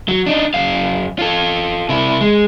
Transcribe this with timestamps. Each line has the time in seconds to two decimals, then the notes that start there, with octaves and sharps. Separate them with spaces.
0.08 F#3
0.27 D4 D#4
0.54 F#2 F5
1.19 F4 A4
1.89 C3 E4
2.21 G#3